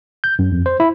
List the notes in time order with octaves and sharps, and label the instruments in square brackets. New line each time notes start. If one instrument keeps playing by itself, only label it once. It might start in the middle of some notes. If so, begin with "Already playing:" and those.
[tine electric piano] G6
F#2
F2
C5
E4